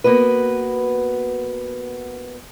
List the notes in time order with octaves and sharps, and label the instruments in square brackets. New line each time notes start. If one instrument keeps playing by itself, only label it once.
[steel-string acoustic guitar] A#3 B3 F#4 B4